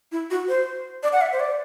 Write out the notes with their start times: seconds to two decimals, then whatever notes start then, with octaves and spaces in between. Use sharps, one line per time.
0.12 E4
0.30 F#4
0.48 C5
1.03 D5
1.12 F#5
1.21 E5
1.32 C5
1.40 D5